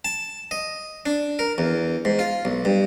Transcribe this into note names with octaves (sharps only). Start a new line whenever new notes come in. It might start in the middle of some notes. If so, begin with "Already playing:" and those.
A5
D#5
D4
A#4
E2
G#2
F4
B1
G2